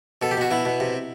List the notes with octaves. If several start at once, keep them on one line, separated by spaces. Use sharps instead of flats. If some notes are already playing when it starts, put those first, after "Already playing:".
B2 A4
G4
B2 F#4
B2 E4
B2
C3